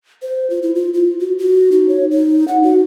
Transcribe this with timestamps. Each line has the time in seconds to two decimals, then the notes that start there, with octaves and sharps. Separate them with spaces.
0.22 C5
0.50 F4
0.63 E4
0.75 F4
0.94 F4
1.20 F#4
1.39 F#4
1.71 D#4
1.89 C#5
2.11 D#4
2.48 F#5
2.63 F#4